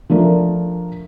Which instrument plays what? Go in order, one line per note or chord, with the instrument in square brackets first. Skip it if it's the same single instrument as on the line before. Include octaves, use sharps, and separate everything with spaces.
[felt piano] F3 A3 D4 A#4